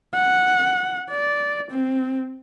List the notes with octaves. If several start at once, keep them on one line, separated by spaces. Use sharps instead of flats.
F#5
D5
C4